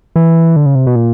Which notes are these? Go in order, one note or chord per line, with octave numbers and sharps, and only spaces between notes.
E3
D3
C#3
C3
B2
A#2